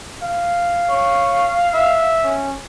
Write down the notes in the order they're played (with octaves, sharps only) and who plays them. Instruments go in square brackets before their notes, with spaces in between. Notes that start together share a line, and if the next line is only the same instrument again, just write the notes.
[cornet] F5
[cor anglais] C#5
E5
[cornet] C#4